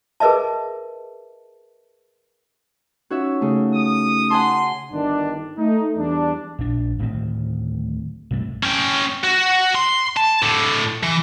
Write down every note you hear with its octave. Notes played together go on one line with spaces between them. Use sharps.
G#4 A#4 B4 D#5 E5 A5
C#4 D#4 F4 F#4 C#5 E5
C#3 A3
D#6
F#5 G#5 A5 C6
G1 D#3 D4
A3 D#4
E2 G3 D4
A#1 D4
D1 A2 D#3 C4
B1 G2 C3 A3
C#4 G5
F#4
C6
A5
A2 D3
E3